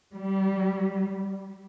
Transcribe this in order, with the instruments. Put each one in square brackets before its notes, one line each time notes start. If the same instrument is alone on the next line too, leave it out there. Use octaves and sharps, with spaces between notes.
[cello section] G3